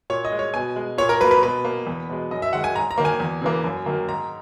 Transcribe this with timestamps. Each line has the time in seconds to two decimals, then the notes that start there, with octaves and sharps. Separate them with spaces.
0.10 A#2 C#5
0.25 D#5
0.32 G#3
0.39 C#5
0.54 B2 G#5
0.76 G#3
0.98 A#2 C#5
1.09 A#4
1.20 F#3 B4
1.24 A#3
1.31 B4
1.43 B2 B4
1.65 A#3
1.87 E2
2.09 B2 G#3
2.31 F#2 D#5
2.42 E5
2.53 D#3 G#3 F#5
2.64 G#5
2.75 G#2 A#5
2.91 A#5
2.98 D#3 A#3
3.05 G#5
3.20 E2
3.42 C#3 E3 A#3
3.64 F#2
3.86 D#3 F#3 A#3
4.08 G#2 A#5